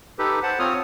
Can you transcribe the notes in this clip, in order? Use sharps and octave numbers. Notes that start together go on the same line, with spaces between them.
D#4 G4 A4 B4
C5 F#5 A5
C4 F4 C#5 D#6 F6